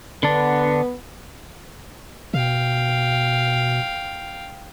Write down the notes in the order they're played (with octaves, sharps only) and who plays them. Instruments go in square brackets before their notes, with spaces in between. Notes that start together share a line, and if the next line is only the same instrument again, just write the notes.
[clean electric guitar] D3 D4 [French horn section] B3
[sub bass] B2 [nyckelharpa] F5 G5